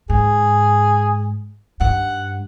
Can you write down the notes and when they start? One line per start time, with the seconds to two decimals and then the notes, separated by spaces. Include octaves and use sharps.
0.10 G#2 G#4
1.80 G2 D#3 F#5